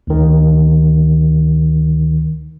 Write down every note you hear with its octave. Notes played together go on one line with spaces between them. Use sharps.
D2 D#3